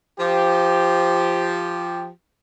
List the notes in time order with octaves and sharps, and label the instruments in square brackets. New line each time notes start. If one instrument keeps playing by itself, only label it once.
[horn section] F3 G4